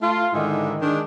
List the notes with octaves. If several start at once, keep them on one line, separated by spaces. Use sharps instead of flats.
A3 F4
G#2 D3 D#3 D#4 E4
D#3 G#3 D4